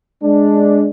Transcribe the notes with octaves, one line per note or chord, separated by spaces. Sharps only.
G#3 D4